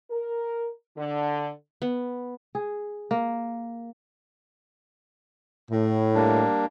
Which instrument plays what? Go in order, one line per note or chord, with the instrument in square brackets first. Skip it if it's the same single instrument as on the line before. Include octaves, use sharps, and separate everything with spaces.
[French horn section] A#4
D3
[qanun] B3
[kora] G#4
A#3
[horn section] A2
[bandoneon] G3 A#3 D4